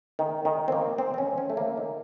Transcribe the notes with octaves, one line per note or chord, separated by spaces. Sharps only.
D#3
D#3
C4
A#3
C4
C4
C#4
C#4
A3
A#3
D#3